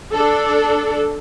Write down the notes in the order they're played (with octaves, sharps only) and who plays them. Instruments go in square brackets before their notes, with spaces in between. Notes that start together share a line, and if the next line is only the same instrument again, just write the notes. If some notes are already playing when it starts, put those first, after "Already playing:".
[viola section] D4 A4